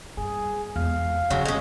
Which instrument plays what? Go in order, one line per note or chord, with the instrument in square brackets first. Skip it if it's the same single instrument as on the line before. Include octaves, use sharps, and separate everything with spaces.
[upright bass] G2 [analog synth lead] G#4
[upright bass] E2 G#3 [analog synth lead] F5
[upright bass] D#1 A1 [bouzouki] C#3 F#3
[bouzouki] G#3 C#4